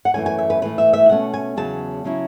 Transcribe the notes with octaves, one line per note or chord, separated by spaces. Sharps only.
F#5
F#2 E3 A3 C#4 G#5
G#5
E5
B4
A2 E3 A3 B4
E5
E5
B2 A3 C#4 F#5
G#5
E2 C#3 F#3 A5
C#3 F#3 C#4 E4